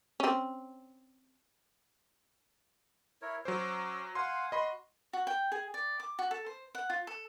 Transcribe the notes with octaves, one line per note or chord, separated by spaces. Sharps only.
C4 C#4
E4 A#4 C#5
F#3 C#4 C5 D6 E6
F5 F#5 G#5 C6
F#4 D#5 B5 C6
F#4
G5
G#4
D5
D6
F#4
A4
C5
F#5
F4
A4